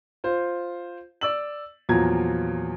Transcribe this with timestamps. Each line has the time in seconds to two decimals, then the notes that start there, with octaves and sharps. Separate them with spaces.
0.24 F4 C5
1.21 D5 E6 F#7
1.89 E2 A#2 F3 F#3 A#5 G#6